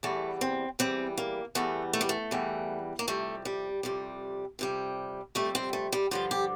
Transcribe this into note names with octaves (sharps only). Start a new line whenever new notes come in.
E2 E3 G3 A3
C4
E2 E3 G3 C4
A#3
E2 E3 G3 A3
A3
G3
A3
E2 E3 G3
A#3
F2 C3 G3 A3
G3
F2 C3 G3
F2 C3 G3
F2 C3 G3 A3
C4
A3
G3
G2 D3 F3 F4
G4